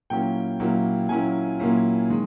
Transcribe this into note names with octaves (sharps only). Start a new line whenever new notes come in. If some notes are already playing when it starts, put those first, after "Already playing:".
A#2 F#3 A#3 C#4 E4 G5
A#2 F#3 A#3 C#4 E4
A#2 F#3 A#3 C#4 E4 G#5
A#2 F#3 A#3 C#4 E4
D#3 G#3